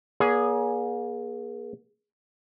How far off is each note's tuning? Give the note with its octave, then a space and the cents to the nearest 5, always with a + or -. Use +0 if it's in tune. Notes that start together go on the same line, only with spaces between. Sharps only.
A#3 +40 G#4 +0 C#5 +45